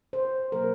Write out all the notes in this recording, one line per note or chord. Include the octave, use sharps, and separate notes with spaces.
C5
B2 F#3 A#3 A#4